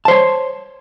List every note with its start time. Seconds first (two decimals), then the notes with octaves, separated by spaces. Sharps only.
0.05 A5
0.08 C5
0.11 C#5